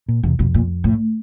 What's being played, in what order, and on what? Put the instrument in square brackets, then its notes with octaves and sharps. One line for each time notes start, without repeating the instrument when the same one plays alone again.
[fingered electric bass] A#2
[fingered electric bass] E2 [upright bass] C3
[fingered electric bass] F2 [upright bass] B2
[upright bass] A#2
A2